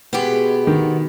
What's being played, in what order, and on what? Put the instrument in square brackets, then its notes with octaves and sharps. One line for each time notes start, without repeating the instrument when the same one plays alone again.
[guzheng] B2 G#3 [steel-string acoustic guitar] B3 G4
[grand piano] D#3